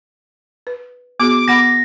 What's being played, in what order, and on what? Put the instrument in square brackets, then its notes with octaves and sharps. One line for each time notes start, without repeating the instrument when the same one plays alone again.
[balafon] B4
[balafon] B3 F#4 G#4 [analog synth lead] D6
[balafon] B3 F#5 B5 [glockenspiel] A#6